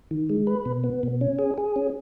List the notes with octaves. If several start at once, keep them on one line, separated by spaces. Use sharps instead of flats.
D#3
G#3
B4
B2
B3
B2
C#4
G#4
G#4
C#4